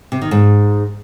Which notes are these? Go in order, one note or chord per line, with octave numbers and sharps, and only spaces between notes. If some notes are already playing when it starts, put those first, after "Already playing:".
C3
D#3
G#2